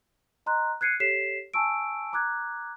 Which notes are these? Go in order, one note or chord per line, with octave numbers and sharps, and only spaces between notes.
D#5 A#5 C6 F#6
F#6 G#6 C7 C#7 D#7
G4 A4 C#5 B6 C7 E7
G#5 A5 C#6 E6 D7
A#5 D6 F6 F#6 G#6